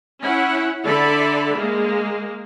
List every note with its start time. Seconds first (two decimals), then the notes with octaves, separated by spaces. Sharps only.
0.21 C#4 E4 F#5
0.84 D3 A4 D5 E5 B5
1.56 G#3 A#3